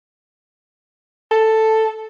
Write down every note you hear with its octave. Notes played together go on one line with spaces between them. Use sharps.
A4